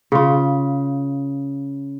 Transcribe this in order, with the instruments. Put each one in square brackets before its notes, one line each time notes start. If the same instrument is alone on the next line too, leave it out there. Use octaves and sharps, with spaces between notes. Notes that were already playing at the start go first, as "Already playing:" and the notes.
[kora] C#3 F4